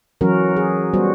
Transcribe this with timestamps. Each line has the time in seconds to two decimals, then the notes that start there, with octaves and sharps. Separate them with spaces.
0.21 E3 F#3 C#4 F#4 A#4
0.56 G#4
0.93 G3 B3 F#4 C5